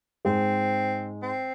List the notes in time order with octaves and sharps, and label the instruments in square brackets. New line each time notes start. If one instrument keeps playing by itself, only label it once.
[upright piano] G#2 G#3 [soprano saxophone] C4
[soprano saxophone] C4